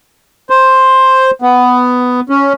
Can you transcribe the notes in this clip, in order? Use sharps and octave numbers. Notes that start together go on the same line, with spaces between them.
C5
B3
C#4